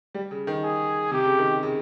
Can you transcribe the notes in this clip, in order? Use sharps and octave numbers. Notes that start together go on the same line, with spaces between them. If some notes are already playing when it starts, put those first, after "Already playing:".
G3
C#3
D#3
G#4
C3 G4
C#3
D#3
C#3